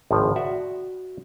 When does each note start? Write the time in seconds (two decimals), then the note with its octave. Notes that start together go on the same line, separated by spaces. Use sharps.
0.11 G#1 C#2 A2 F3
0.36 F#4 D5 E5